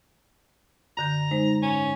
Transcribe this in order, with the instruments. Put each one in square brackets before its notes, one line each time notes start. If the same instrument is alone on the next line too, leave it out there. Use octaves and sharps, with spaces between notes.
[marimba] F#2 D3 G6 [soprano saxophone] A#5
[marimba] G#3 D#4 C5
[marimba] G#2 [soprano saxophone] C#4